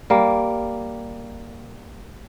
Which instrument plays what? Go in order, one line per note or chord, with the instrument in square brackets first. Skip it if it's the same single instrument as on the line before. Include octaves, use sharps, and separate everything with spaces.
[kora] G3 A#3